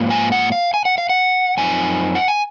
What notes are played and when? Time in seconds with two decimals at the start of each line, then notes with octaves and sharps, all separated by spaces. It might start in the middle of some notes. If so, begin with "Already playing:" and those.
Already playing: G#2 F3 A#3
0.10 G#5
0.32 F#5
0.52 F5
0.74 G#5
0.85 F#5
0.98 F5
1.09 F#5
1.57 F#2 F3 C4 D#4 G#5
2.15 F#5
2.28 G#5